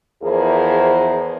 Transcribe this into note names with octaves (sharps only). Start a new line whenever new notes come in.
E2 F3 E4 G#4 A#4 C5